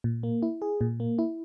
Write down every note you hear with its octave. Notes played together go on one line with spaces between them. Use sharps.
A#2
A#3
E4
G#4
A#2
A#3
E4